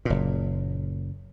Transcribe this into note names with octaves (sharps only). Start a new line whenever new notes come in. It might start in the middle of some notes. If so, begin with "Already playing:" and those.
F#1 A#2